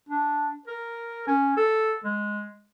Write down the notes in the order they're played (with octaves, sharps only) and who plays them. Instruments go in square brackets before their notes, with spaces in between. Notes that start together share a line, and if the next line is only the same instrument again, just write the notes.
[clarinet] D4
A#4
C#4
A4
G#3